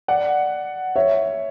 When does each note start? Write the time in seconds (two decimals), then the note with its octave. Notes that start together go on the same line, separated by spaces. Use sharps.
0.08 D5 F#5
0.96 C#5 E5